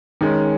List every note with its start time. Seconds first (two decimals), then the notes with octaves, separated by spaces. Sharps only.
0.21 D#3 G#3 C#4